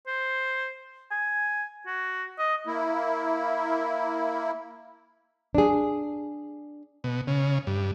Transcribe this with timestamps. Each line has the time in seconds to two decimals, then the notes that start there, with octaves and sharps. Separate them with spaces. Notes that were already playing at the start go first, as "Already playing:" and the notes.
0.07 C5
1.11 G#5
1.87 F#4
2.38 D#5
2.65 A#3 E4
5.55 D4 G#4
7.04 B2
7.27 C#3
7.67 G2